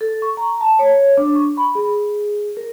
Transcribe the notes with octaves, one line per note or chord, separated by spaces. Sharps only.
A4
C#6
A#5
A5
C#5
D4
C#6
B5
G#4
A#4